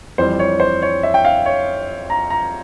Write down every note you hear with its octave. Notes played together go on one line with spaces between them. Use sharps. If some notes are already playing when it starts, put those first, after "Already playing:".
F2 E3 G3 C5
C#5
C5
C#5
E5
G5
F5
C#5
A#5
A#5